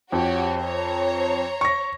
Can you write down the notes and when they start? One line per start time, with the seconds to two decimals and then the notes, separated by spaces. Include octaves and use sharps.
0.12 F2 F#4 G4 C#5
0.60 C5 C#5 A#5
1.61 C#6 A#6